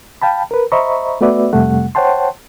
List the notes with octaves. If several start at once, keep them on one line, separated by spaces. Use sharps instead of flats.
F5 G5 A5 B5
A#4 B4
C5 D#5 E5 A#5 B5 C#6
A3 B3 F#4 B4 D5 E5
F2 C3 G3 A3 F#5
C5 C#5 F#5 G5 A5 C6